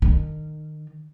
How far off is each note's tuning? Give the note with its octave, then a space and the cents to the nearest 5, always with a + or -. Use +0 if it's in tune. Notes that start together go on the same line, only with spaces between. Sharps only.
D#3 -25